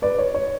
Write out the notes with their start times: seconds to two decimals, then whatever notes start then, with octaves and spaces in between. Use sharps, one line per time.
0.02 B4 D5
0.19 C#5
0.35 C#5